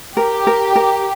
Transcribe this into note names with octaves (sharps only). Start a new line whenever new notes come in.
G4 A#4
A#4
A#4